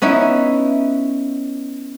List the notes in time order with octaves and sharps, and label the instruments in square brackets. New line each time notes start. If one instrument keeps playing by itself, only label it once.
[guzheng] B3 C#4 D#4 E4